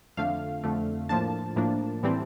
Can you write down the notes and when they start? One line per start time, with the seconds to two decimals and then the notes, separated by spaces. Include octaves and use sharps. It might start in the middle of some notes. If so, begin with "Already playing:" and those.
0.17 F2 D3 A3 F5
0.64 F2 D3 A3
1.09 A2 F3 A#3 D4 A5
1.56 A2 F3 A#3 D4
2.03 A2 E3 G3 C4